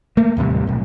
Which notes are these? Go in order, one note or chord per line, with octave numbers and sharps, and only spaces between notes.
A3 A#3
D#2 A2 C3 G3
B1 A2